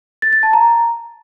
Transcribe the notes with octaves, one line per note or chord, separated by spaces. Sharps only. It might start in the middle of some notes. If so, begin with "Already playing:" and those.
A6
A6
A5
A#5